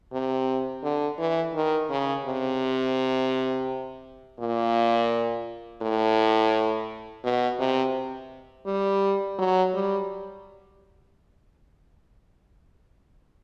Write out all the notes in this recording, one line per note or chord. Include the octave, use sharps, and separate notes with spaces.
C3
D3
E3
D#3
C#3
C3
A#2
A2
B2
C3
G3
F#3
G3